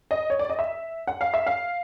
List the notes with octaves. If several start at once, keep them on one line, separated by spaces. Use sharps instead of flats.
D#5
C#5
D5
D#5
E5
F#5
F5
E5
F5